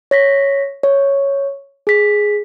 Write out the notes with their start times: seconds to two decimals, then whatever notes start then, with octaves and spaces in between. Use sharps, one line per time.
0.11 C#5 A#6 B6
0.83 C#5
1.87 G#4 B6